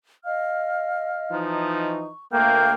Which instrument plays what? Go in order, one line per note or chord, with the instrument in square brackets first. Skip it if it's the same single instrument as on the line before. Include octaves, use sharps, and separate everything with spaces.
[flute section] D#5 F5 F6
[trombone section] E3 F3 D#4
[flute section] C#6
[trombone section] D2 A3 A#3 [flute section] G5 F6 G6